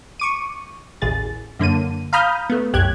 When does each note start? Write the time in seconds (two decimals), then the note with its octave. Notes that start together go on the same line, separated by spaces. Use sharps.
0.20 C#6 D6 D#7
1.02 A1 D#2 G#4 A6
1.59 F#2 D3 A#3 D#7
2.13 F5 A#5 B5 D#6 F6 G6
2.50 A3 B3
2.73 C2 F#2 G4 F#6 G#6